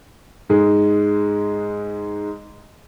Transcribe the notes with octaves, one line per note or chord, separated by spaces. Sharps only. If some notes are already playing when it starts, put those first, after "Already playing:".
G#2 G#3